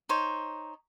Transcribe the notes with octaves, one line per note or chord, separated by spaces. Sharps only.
D#4 C5 C#5